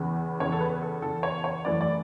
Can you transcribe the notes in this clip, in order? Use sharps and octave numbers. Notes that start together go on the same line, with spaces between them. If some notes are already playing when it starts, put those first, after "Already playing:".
Already playing: E2 C#3 E3
E2 C#3 E3 C#5
A4
B4
A4
E2 C#3 E3 A4
C#5
C#5
F#2 E3 A3 D5
D5